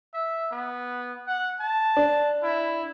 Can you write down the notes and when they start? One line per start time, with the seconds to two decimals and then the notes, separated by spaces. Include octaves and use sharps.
0.14 E5
0.51 B3
1.27 F#5
1.60 A5
1.97 D4
2.43 E4